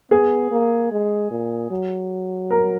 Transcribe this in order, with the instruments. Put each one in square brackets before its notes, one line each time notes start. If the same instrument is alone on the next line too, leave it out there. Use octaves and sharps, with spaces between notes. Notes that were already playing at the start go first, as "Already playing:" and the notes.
[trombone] B3 [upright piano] G#4
[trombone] A#3
G#3
A#2
F#3
[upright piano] A#4